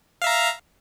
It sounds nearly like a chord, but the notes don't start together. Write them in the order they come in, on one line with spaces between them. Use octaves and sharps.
F5 E5 A#5